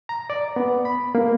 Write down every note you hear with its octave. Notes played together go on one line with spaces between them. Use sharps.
A#5
D5
B3
B5
A#3